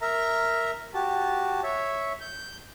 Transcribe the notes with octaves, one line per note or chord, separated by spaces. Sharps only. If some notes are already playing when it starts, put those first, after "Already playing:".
A#4 E5 A#5
F#4 G4 A5
C#5 E5
G6